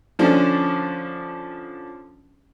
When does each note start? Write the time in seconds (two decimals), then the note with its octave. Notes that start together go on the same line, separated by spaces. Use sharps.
0.19 D3 F3 C#4 D4